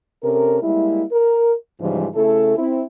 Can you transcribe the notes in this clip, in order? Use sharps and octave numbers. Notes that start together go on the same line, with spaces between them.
C3 C#4 A4 A#4
G3 G#3 A#3 E4
A#4
G#2 C#3 E3 F3 G3 G#3
C#3 A3 E4 A4
C4 E4